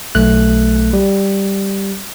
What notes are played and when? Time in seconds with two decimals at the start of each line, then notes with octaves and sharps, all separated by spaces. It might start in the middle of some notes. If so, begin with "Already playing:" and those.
0.15 B1 A3 F#6
0.93 G3